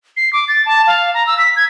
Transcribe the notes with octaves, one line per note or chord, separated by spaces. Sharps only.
C7
D6
A6
A5
F5
A#5
E6
B6
G#6